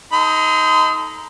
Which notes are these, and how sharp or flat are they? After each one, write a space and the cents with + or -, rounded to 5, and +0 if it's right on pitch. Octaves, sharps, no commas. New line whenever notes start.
D#4 +15 A4 -10 C6 -35